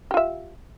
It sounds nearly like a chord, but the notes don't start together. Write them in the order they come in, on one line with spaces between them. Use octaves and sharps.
G4 F4 E5